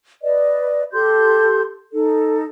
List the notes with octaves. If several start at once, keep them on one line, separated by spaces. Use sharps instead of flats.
B4 D5 D#5
G4 A4 C6 G6
D#4 A4